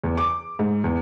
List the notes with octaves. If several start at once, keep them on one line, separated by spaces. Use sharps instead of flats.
E2
D6
G#2
E2